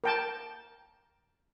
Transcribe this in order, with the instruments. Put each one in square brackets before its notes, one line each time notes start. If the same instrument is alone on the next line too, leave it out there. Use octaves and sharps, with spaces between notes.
[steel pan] A#4 G5 A5